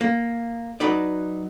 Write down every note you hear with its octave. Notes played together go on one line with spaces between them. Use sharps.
A#3
F#3 D#4 B4 D5